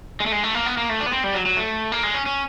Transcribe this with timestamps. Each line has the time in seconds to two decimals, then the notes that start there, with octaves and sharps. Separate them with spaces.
0.20 G#3
0.26 A3
0.32 G#3
0.44 A3
0.54 A#3
0.66 B3
0.77 A#3
0.89 A3
1.00 D4
1.06 B3
1.12 C4
1.24 G3
1.35 F#3
1.46 F#3
1.57 A3
1.92 A#3
2.03 G#3
2.14 C#4
2.26 C#4